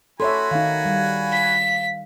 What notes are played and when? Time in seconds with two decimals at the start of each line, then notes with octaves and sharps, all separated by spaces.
0.20 F#4 A4 C#5 E5 G#5 B5 C6
0.51 D#3 D#4 F5
0.85 G3
1.32 B6